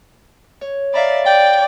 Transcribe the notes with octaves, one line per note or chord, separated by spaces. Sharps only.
C#5
D5 E5 F5 A#5 B5
D5 G5 D6